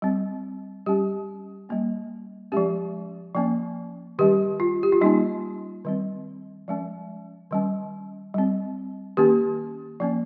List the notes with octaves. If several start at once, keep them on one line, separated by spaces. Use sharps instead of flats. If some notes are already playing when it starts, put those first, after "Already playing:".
G3 C4
G3 C#4 G4
G3 A#3 C#4
F3 G#3 C#4 G4
F3 A#3 C#4
D#3 G3 C#4 G4
F4
G4
F4
G3 A#3 C#4 D#4
D#3 G3 C4
F3 G#3 C#4
D#3 G3 C#4
G3 C4
D#3 A#3 C#4 G4
F3 A#3 C#4